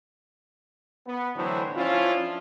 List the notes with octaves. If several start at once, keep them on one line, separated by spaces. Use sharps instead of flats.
B3
A2 D3 E3 F#3 E4 C5
F3 C#4 D4 E4 F4